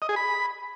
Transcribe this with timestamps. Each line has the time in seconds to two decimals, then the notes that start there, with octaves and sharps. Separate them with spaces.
0.02 D#5
0.09 G#4
0.16 B5